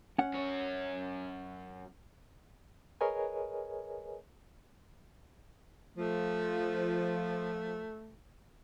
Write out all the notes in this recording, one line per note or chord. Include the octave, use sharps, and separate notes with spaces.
C#4 F#5
F#2 C#5
G#4 A#4 B4 C#5 D#5 G#5
F3 A3